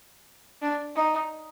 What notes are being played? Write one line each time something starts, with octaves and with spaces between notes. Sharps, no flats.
D4
D#4